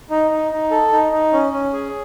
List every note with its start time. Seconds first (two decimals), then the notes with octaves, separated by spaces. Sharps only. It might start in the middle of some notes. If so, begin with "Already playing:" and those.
0.10 D#4
0.31 D#4
0.52 D#4
0.71 A4
0.92 D#4
1.12 D#4
1.33 C#4
1.53 C#4
1.73 G#4